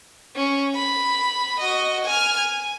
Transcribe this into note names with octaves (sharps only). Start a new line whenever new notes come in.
C#4
B5
F#4 D#5
G#5 F6
G#5